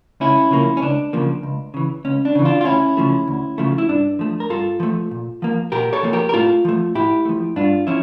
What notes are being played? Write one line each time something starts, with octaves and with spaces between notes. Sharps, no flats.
C#2 C#4 E4
C#3 F3 A#3
C#4
C#2 D4
C#3 F3 A#3
C#2
C#3 E3
C#2 C#4
D4
C#3 E3
D4 F4
F4
D2 C#4 E4
C#3 F3 A3
D2
C#3 F3 A3
E4
G2 D4
F3 A3
A#4
G2 F4 A4
F3 A3
A#2
F3 A#3
A#2 G4 A#4
A4 C#5
F3 A#3
G4 A#4
A#4
A2 F4 A4
F3 A3
A2 E4 G4
F3 A3
G2 D4 F4
F3 C#4 E4